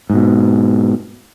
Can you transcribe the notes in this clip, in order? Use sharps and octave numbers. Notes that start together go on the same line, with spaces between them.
G#2 B2